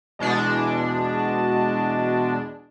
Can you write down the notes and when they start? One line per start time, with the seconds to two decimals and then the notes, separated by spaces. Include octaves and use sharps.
0.19 E2 B2 G#3 D4